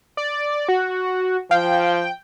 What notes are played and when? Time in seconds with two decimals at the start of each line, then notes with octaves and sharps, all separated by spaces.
0.17 D5
0.68 F#4
1.51 F3 F5 G5